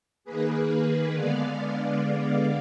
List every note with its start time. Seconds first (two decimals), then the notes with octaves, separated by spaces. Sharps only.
0.24 D#3 A#3 G#4 B4
1.14 D3 G#3 B3 D5 F5